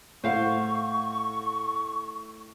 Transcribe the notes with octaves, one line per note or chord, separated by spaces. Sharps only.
A2 C5 F5 F#5 C#6